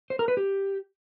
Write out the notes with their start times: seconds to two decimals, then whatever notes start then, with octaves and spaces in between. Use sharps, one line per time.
0.10 C5
0.19 A#4
0.28 B4
0.37 G4